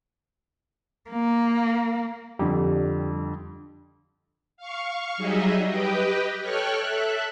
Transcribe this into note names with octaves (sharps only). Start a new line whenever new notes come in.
A#3
F2 D3 G3
F5 C#6
F#3 G3 D#4 G#4 D#5 E5
G4 B4 D#5 G5
A4 C#5 G5 C#6 F6 F#6
A4 E5 F#6